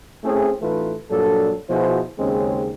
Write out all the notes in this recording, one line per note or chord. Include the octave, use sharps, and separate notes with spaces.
A3 C4 C#4 E4 G#4
A1 E3 A3 D#4 F4 B4
G2 A#2 F#3 D4 A4
B2 F3 E4 F#4 G#4 C5
D#2 C#3 G#3 C4 C#4